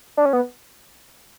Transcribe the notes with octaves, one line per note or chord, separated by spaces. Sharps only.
D4
C#4
B3